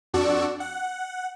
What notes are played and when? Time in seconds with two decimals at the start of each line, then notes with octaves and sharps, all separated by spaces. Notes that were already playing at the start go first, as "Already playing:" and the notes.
0.14 F2 D4 F#4 D5 C#6 E6
0.60 F#5